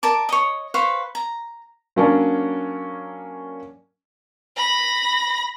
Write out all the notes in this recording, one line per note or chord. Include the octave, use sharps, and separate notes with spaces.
A#4 D5 A5 D6
C#5 D#5
B4 C5 F5 C#6
A#5
F#3 A#3 C#4 D4 A#4 D5
B5 A#6